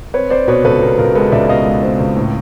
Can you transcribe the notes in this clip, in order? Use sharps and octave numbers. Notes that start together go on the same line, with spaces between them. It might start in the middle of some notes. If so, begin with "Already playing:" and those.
C4 B4 C#5
C4 C5 D5
B2 B4 C#5
C#2 A4 B4
B2 A#4
C#2 A#4
G#3 A4 B4
C#2 D5 E5
B2 D#5 F5
G#3
C4
C#2
A2